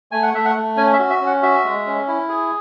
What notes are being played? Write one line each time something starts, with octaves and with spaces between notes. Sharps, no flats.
A3 G#5
F#5
A3 E5
F#5
A3
C#4 G#5
E5
F#4
E5
C#4
F#5
F#4 E5
G#3
C#4
E4
G#4